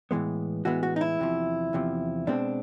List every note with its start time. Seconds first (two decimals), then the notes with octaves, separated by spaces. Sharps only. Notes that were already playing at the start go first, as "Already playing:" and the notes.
0.11 A2 E3 G#3 B3
0.65 A2 E3 G#3 B3 F#4
0.83 F#4
0.96 D#4
1.01 E4
1.19 E2 C3 F3
1.73 E2 C3 F3
2.27 B2 G#3 C4 D4